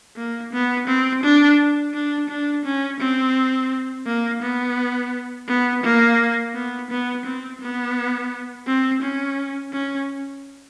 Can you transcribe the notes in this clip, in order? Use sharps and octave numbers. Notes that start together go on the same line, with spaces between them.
A#3
B3
C4
D4
D4
D4
C#4
C4
A#3
B3
B3
A#3
B3
B3
C4
B3
C4
C#4
C#4